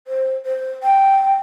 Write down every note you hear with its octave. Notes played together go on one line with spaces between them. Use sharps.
C5
C5
G5